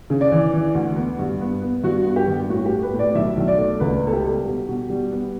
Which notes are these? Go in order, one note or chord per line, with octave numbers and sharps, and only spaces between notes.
C#3
D5
E3
E3
D2
B3
G2
B3
B3
G2 F#4
B3
G4
G2
A2 F#4
G4
A3
B4
A2
D5
B1 E5
B1
D5
A3
C#2 B4
B3 A4
G4
G3
B2
B2
G3
B3